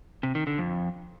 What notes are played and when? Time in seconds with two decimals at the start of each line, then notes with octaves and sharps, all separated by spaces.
0.23 C3
0.35 D#3
0.47 D3
0.59 F2